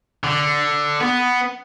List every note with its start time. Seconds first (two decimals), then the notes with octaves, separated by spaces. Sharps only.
0.24 D3
1.01 B3